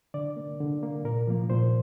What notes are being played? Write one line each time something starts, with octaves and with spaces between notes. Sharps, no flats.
D3 D5
A#3
D3
A#3
A#2 A#4
F3 A#3
A#2 C5